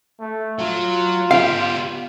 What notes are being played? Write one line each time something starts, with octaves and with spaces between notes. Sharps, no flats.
A3
F#3 F4
B3 G4 F5